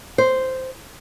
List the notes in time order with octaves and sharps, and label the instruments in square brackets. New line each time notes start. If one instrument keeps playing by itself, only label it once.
[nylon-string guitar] C5